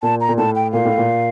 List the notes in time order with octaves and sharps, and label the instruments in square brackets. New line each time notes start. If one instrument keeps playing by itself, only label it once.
[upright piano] A#2 [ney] A5
[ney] A#5
[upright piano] A#2
[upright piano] A2 [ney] A5
[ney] G5
[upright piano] A#2 [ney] F5
[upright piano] A2
A#2